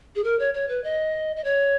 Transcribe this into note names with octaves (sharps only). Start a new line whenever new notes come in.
G#4
A#4
C#5
C#5
B4
D#5
D#5
C#5